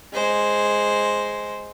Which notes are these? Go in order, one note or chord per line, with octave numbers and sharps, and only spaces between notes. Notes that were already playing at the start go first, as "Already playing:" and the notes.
G#3 C5